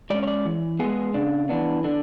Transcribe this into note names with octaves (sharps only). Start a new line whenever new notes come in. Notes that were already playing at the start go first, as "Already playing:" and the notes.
G#3 C#4 D5
C#5
D5
E3
G#3 B3 G#4
C#3 D4
E3 B3 D4
D3 D4